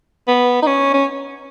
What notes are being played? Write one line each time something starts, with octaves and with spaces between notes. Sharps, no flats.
B3
D#4
C#4
C#4